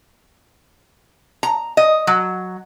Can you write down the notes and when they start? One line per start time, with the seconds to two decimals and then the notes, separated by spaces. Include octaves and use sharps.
1.43 A#5
1.77 D#5
2.07 F#3